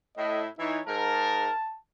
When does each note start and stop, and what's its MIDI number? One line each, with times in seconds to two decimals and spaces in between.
0.17 0.47 45
0.17 0.47 64
0.17 0.43 75
0.59 0.80 52
0.59 0.80 63
0.59 0.80 64
0.59 0.80 73
0.87 1.50 44
0.87 1.50 70
0.87 1.78 81